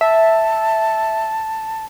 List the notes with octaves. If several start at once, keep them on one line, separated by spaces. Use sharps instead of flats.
E5 A5